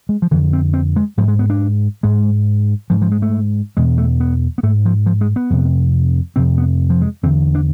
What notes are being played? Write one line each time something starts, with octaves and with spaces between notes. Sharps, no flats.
G#3
F3
F2 D3 E3
C4
C4
G#3
G#2 F3
G#3
B3
D4
G#2 G#3
G#2 F3
F3
G#3
A3
E2 B2 G#3
A3
B3
B3
G#2 A3
F3
F3
G#3
B3
F2 C3
F2 C3 C4
B3
F3
G#3
E2 D3 C4
D4